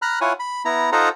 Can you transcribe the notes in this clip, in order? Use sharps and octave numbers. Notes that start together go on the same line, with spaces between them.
A#5 B5 F6 F#6
E4 F4 C#5 F#5 G#5
B5
B3 E4 A#5
D#4 F4 A4 C5 F#5 A#5